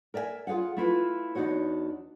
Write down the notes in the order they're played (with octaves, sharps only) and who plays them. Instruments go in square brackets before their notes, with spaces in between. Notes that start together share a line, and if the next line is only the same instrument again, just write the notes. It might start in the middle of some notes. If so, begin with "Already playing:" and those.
[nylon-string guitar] A#4 D5 E5 F#5 G#5
F4 G#4 C#5 F5 F#5
A3 E4 F4 B4
E2 D4 D#4 F#4 C#5